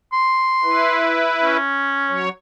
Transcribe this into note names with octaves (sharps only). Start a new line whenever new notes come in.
C6
E4 B4
C#4
F#3 C#5